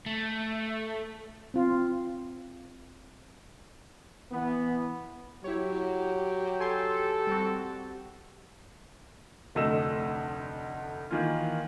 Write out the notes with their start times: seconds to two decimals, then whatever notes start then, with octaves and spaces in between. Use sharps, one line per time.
0.06 A3
1.54 C4 F4
4.32 E3 B3
5.44 F#3 E4 G4 C#5
6.60 A4 G#5 C6
7.27 G3 C4 F#4
9.55 F1 D2 A3 D#5 E6 E7
11.11 D#3 E3 A#3 F4